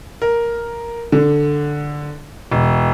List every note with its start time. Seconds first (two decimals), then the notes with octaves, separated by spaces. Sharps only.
0.22 A#4
1.12 D3
2.51 E1